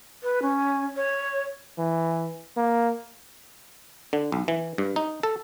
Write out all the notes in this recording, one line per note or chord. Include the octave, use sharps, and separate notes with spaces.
B4
C#4
C#5
E3
A#3
D3
B1
E3
G2
D#4
A4